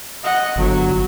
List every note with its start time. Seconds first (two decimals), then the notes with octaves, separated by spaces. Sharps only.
0.24 D#5 F#5
0.56 G1 F#3